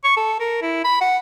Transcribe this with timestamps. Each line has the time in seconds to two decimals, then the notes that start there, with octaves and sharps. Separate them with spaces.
0.04 C#6
0.17 A4
0.40 A#4
0.62 E4
0.85 B5
1.01 F#5